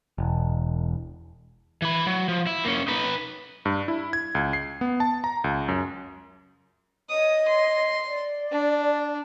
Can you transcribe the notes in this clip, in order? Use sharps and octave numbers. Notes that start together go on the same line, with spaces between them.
E1
E3 B5
F#3
F3
E4
A#3 C#4
D#4 B4
G2
E4
G#6
C#2
C7
B3
A5
A#5
C#2
F#2
C#5 D#5 D#6
C6
D5
D4